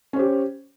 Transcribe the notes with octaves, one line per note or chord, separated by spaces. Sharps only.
C#4 G4 C5